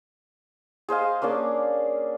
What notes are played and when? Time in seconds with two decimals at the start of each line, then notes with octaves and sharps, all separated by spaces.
0.89 G#4 C5 D#5 F5
1.22 A#3 C#4 D4 G#4